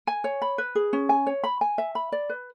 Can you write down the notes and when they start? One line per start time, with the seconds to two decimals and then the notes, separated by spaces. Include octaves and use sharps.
0.07 G#5
0.24 C#5
0.42 B5
0.58 B4
0.75 G#4
0.93 C#4
1.09 G#5
1.26 C#5
1.44 B5
1.61 G#5
1.78 E5
1.95 B5
2.12 D5
2.29 B4